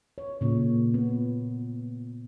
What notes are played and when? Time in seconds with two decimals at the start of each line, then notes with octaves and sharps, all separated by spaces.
0.18 C#5
0.41 A#2 C#3
0.94 B3